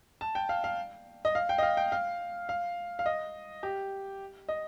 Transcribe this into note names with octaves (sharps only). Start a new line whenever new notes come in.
A5
G5
F5
F5
D#5
F5
G5
D#5
F5
G5
F5
F5
F5
D#5
G4
D#5